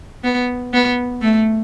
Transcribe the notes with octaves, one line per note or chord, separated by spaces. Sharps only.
B3
B3
A3